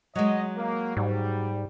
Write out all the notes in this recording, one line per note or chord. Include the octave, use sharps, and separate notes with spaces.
F#3 G#3 D#5
A#3
G#2 G3